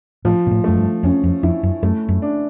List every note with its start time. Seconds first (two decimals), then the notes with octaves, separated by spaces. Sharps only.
0.25 A2 F3
0.47 A#2
0.51 A2
0.64 F#2 A3
0.77 G2
1.03 F2 C#4
1.24 F2
1.43 F2 E4
1.63 F#2
1.83 F#2 A3
2.09 F#2
2.22 D4